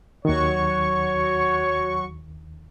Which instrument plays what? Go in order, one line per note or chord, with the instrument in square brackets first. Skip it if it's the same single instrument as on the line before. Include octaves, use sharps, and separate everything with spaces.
[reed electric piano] D#2 D#3 [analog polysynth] F#3 F#4 C#6 [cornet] C#5